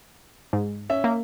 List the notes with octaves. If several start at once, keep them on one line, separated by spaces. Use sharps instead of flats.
G#2
C#4 E5
A#3